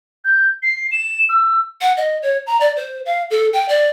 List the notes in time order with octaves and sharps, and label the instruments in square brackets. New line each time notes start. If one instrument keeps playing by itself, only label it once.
[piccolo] G6
C7
E7
E6
[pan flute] F#5
D#5
C#5
A#5
D5
C5
F5
A4
G5
D5